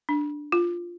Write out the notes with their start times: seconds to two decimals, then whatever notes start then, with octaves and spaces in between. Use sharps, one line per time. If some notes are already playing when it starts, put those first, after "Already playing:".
0.09 D4
0.52 F4